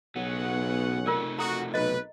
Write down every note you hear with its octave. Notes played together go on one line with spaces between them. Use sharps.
B1 C#3 F#3 B3 C#4 F#5
C3 A3 D#4 F4 A#4 D5
F#4 A4 A#5
B1 B4 D#5